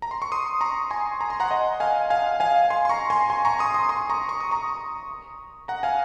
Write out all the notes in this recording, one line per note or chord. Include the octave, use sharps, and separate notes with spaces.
A#5
C6
C#6
C6 D#6
A#5 C#6
G#5 C6
A#5
C6
F#5 A#5
D#5 F#5
F5 G#5
F5 G#5
F5 G#5
G#5 C6
C6
A#5 C#6
G#5 C6
G#5 C6
A#5 C#6
C6 D#6
C6 D#6
C6 D#6
A#5 C#6
C#6
D#6
A#5 C#6
F#5 A#5
F5 G#5